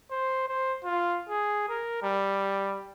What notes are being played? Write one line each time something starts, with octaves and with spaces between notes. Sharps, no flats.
C5
C5
F4
G#4
A#4
G3